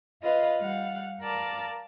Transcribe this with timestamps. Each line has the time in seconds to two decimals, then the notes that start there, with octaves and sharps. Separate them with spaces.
0.22 F4 B4 D#5 F5
0.60 G3 F5 F#5
1.21 A#4 D5 F5 A5